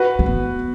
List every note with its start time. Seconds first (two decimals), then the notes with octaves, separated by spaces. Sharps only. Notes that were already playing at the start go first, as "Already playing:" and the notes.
Already playing: F#4 B4
0.19 G#3
0.26 B3